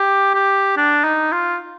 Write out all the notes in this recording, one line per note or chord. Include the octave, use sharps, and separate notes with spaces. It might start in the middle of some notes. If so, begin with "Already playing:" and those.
Already playing: G4
G4
D4
D#4
F4